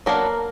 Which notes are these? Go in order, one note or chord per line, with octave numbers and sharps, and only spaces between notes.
F#3 A#3 B3 D4 A#4